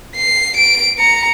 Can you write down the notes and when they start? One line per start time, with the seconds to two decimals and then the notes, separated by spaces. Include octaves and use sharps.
0.16 C7
0.57 D7
0.99 A#5 C#7